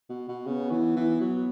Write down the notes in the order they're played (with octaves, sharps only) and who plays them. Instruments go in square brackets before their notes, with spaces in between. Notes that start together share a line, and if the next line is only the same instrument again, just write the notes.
[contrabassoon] B2
B2
[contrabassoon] C#3 [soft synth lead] B3
[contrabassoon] E3
E3
F#3